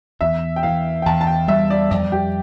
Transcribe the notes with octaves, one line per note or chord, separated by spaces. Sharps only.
E2 E5
G5
E3 F5
G5
E2 A5
A5
G5
G3 E5
D5
F2 D5
G4